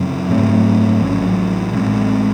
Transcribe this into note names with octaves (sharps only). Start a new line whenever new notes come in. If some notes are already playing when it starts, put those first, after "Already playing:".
Already playing: F#2 C#3 F#3 C4
G#2 F#3 A3 C4
A1 A2 F#3 C#4
A1 A2 G#3 C4